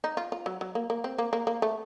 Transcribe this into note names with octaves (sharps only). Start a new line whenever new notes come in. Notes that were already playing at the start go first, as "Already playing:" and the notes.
D#4
F4
F4
F#3
F#3
A#3
A#3
C4
A#3
A#3
A#3
A3